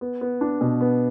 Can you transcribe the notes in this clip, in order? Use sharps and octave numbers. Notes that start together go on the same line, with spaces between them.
B3
B3
D4
B2
B3